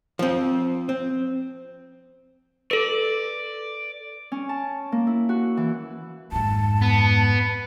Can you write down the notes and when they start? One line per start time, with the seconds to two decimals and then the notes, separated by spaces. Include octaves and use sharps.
0.19 F3 C4
0.89 C4
2.71 A4 B4 D5
4.32 C#4
4.49 A5
4.92 A#3
5.07 E4
5.29 F#4
5.57 E3
6.32 F2 G#2 A5
6.82 B3